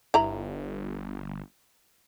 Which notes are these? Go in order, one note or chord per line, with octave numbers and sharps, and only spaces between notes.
G1 E4 A#5 B5